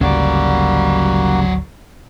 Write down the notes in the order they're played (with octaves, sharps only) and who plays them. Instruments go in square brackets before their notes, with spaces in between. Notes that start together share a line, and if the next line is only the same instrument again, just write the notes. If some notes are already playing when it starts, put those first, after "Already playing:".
[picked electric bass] G#1 D2 [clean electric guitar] C#3 G3 [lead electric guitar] F#3 D5 [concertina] A#3 F#4